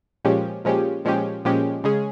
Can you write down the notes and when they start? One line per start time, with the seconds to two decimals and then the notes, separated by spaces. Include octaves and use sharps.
0.25 A#2 F3 G#3 C#4 G4
0.65 A#2 F3 G#3 C#4 G4
1.05 A#2 F3 G#3 C#4 G4
1.45 A#2 F3 G#3 C#4 G4
1.84 C#3 G#3 C#4 G#4